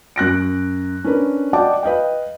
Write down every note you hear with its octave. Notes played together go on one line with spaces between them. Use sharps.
F#2 F#6 A#6 D7
C#4 D4 A#4 B4
D5 D#5 F#5 G5 A5 D6
B4 D#5 F5 G5